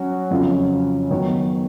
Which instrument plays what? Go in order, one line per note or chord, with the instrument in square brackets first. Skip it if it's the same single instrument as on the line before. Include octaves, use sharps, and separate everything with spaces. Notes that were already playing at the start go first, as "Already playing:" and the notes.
Already playing: [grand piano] F#3 C#4 F#4
F2 C#3 F#3 C#4 F4
D#3 F#3 B3